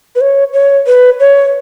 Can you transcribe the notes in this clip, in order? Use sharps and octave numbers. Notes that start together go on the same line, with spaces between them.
B4
C#5
C#5
B4
C#5